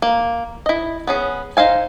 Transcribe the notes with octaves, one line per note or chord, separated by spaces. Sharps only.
A#3
E4 D#5
B3 C#4 G#4
D#4 C5 F5 G#5